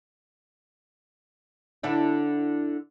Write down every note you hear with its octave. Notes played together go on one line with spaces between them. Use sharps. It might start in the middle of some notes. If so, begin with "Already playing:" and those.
D3 D4 E4